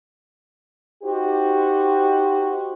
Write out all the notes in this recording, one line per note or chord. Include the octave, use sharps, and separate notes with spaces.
D#4 F#4 G4 C5